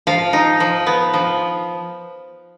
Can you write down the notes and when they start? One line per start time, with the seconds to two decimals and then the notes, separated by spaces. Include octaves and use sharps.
0.07 F3 F5
0.33 D#4
0.60 F3
0.86 B3
1.14 F3